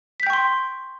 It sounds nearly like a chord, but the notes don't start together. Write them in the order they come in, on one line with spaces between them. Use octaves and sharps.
B6 G6 G5 C#6 C6